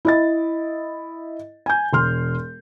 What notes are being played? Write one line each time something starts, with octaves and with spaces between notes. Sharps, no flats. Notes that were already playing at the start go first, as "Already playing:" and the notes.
E4 D#5 A6
G#5 G6
E1 C6 F6